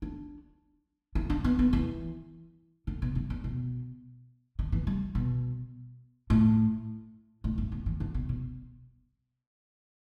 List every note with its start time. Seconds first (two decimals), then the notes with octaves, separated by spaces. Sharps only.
0.02 D4
1.15 E4
1.30 D4
1.44 B3
1.59 B3
1.73 E3
2.87 D3
3.02 B2
3.15 G2
3.30 E2
3.44 B2
4.59 D3
4.72 E3
4.87 G3
5.15 B2
6.30 A2
7.44 A2
7.58 G2
7.72 B2
7.86 E3
8.00 D3
8.14 B2
8.29 B2